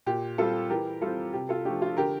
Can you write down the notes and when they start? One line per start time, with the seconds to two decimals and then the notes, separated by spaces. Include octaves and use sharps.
0.06 A#2 G4
0.38 G3 C4 F4 A4
0.70 E3 G4 A#4
1.01 G3 C4 F4 A4
1.33 C3 G4
1.49 F4 A4
1.65 F3 A3 D4 G4
1.82 F4
1.97 D3 G4 A#4